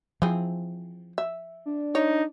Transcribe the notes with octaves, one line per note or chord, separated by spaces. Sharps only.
E3 F3 C4 G#4
E5
D4
D#4 C#5